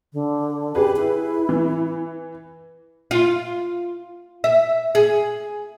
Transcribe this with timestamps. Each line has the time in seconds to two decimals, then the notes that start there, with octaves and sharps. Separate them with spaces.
0.13 D3
0.75 G4 G#4 B4
0.96 E4
1.49 E3
3.11 F4
4.44 E5
4.95 G#4